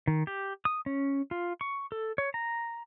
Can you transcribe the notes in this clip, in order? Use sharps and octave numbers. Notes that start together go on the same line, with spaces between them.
D#3
G4
D#6
C#4
F4
C#6
A4
C#5
A#5